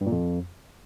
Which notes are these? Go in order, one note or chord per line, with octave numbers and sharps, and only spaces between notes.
G2
A#2
F2